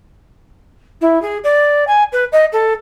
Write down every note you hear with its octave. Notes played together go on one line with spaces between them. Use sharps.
E4
G#4
D5
G#5
B4
D#5
A4